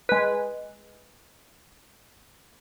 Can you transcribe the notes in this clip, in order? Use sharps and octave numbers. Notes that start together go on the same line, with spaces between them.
G#3 B4